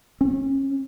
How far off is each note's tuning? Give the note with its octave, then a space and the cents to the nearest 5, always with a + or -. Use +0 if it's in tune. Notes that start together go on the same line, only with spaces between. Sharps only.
C#4 -30